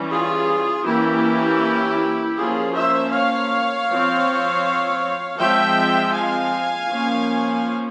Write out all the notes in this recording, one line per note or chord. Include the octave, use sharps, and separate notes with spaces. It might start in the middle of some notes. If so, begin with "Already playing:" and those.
Already playing: E3 G3 C#4
F4 G#4
E3 A#3 C#4 E4 G4
F3 A#3 C#4 F4 G#4
C5 E5
C#5 F5
F3 C4
F3 G#3 C4 E5 G5
F5 G#5
F3 A#3 C#4